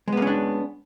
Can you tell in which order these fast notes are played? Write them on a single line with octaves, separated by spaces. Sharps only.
G#3 B3 A#3 C#4 D4